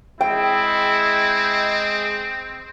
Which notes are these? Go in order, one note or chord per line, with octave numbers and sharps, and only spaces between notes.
G#3 C4 E4 D#5 G5